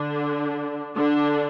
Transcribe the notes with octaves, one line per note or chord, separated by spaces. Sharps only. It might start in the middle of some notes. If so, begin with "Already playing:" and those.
Already playing: D3 D4
D3 D4